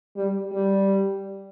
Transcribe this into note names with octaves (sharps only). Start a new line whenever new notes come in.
G3
G3